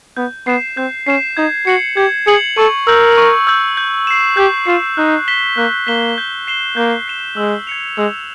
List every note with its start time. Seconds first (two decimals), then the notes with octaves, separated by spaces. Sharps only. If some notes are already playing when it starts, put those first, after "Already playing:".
0.17 B3 G6
0.47 B3 C7 E7
0.77 C4 G6
1.07 C#4 C7 E7
1.37 D#4 G#6
1.67 F#4 C#7 F#7
1.97 G4 G#6
2.27 G#4 C#7 F#7
2.58 A4 C#6
2.87 A#4 E6 G6
3.18 C#6
3.47 E6 G6
3.77 G6
4.07 C7 E7
4.37 G4 G6
4.67 F4 C7 E7
4.97 D#4 F#6
5.28 B6 E7 G7
5.57 A#3 F#6
5.87 A#3 B6 E7 G7
6.18 G6
6.47 C7 E7 G7
6.77 A#3 G6
7.08 C7 E7 G7
7.37 G#3 E6
7.67 G#6 C#7 F7
7.98 G#3 E6